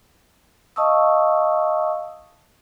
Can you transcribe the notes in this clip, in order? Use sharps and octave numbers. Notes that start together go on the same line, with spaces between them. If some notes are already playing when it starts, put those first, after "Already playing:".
D#5 F5 A5 C#6 D#6 E6